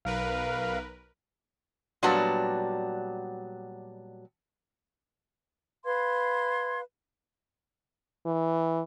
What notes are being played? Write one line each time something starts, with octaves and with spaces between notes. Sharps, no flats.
B1 A#4 B4 F5
A#2 F#3 G3 B3 D4 F#4
B4 F5 C6 G#6
E3